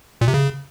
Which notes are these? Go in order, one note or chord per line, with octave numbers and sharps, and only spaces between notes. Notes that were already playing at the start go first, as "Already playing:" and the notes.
A#2
C3
C#3